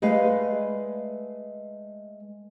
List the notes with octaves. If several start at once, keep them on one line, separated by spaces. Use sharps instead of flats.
G#3 A3 B4 D5 F5